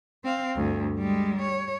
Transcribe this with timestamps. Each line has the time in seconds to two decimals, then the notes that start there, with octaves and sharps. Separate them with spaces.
0.24 C4 F5
0.56 D2 G2
0.98 G3 G#3
1.42 C#5